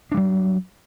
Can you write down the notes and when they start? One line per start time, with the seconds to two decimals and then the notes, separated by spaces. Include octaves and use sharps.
0.12 D4
0.14 G3
0.17 F#3